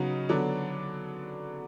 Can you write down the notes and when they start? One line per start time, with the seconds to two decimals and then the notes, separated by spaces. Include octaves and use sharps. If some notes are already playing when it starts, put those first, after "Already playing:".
Already playing: C#3 F#3 B3 D#4 F#4
0.29 D3 F#3 B3 D4